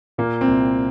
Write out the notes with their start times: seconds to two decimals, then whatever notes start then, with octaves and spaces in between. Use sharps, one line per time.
0.18 A#2 A#3
0.41 C4
0.48 C2